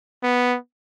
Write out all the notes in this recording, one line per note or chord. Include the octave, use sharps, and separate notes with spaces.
B3